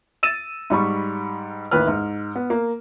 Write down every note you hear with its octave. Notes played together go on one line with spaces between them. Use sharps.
E6 A6 D#7 E7
G#2 G3 B5 C#6
A1 D#2 B4 F6
G#2
B3
A#3